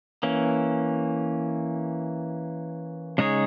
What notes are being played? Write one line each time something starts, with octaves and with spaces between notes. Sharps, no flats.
E3 A#3 C#4
C#3 G#3 D#4 G#4 C#5